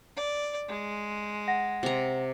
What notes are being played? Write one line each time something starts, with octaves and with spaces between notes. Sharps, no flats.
D5
G#3
F#5 A#6
C3 A#5